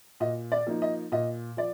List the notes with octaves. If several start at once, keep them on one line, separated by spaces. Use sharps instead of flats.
A#2 D#5
D5
F3 A#3 D#4
D#5
A#2 D#5
F3 D5